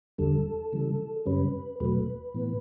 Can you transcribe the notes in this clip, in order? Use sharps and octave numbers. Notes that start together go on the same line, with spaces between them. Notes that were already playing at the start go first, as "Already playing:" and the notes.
E2 D3 G3 A4
C#3 E3 G3
F#2 C#3 G3 C#4 B4
E2 B2 F#3 A3 B4
A2 E3 B3